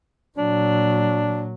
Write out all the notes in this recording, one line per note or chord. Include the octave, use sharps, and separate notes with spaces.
A#2 F#3 D4